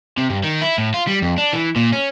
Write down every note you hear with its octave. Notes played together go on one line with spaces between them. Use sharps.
C3
G2
D#3
E4
A2
F4
G3
F2
D4
E3
A#2
C#4